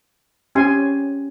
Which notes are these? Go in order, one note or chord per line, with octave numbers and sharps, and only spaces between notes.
C#4 G4 G#5 C6